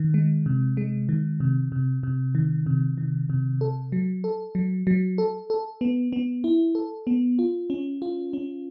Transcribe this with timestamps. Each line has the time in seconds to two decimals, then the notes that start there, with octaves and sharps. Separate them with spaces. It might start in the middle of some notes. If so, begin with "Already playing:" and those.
Already playing: D#3
0.14 G#3
0.46 C3
0.77 G#3
1.09 D#3
1.40 C3
1.72 C3
2.03 C3
2.35 D#3
2.66 C3
2.98 D#3
3.30 C3
3.61 A4
3.92 F#3
4.24 A4
4.55 F#3
4.87 F#3
5.18 A4
5.50 A4
5.81 B3
6.13 B3
6.44 E4
6.75 A4
7.07 B3
7.39 F4
7.70 C#4
8.02 F4
8.33 C#4